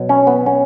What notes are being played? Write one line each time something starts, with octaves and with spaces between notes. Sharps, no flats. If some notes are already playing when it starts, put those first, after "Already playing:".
Already playing: B2 F#3
C#4
B3
C#4